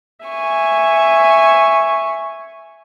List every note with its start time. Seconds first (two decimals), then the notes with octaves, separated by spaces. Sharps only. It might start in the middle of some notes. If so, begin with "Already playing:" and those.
0.25 E5 G#5 C#6